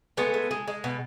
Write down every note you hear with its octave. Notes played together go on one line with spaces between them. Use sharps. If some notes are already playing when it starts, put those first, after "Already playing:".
G#3 A3 B3
G#3
G#3
G#3
B2